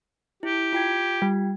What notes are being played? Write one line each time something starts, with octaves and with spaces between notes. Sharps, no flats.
E4 G4
F4 G5 G#6
G3